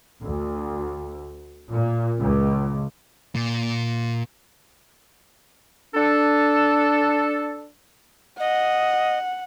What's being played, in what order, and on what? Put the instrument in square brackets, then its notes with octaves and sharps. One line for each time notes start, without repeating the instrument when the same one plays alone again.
[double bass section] D2
A#2
C#2
[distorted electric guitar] A#2
[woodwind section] D4 A4
[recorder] D#5 [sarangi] F#5